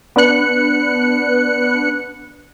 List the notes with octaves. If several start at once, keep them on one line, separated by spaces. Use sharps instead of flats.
B3 D4 B4 F#6 C#7